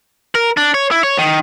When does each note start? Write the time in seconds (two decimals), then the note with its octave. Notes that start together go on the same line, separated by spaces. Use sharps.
0.35 A#4
0.57 D4
0.74 C#5
0.91 E4
1.03 C#5
1.18 D#3